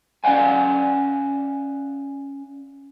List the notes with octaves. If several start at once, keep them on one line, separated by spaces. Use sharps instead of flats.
C#4 D5 F5 F#5 G#5